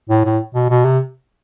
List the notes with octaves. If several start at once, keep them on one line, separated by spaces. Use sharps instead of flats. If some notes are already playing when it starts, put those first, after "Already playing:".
A2
A2
B2
B2
C3